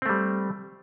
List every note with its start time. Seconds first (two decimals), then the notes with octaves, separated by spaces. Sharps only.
0.02 C4
0.06 A3
0.09 G3